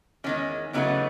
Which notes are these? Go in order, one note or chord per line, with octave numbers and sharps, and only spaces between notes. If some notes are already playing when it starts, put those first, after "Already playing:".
E2 D#3 G#3 C#4
E2 C#3 F#3 A3 B3 D#4